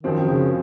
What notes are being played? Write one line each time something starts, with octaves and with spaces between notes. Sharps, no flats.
F#2 D#3 F3 C4
C#3